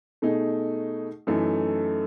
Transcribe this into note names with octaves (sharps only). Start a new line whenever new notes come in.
B2 A3 D#4 G#4
F#2 E3 A3 D#4 A4